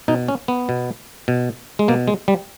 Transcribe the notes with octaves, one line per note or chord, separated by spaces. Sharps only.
B2 D#4
C#4
B3
B2
B2
G#3
B2 A#3
G#3
G3